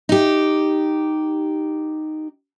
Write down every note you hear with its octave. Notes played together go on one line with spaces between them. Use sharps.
D#4 G4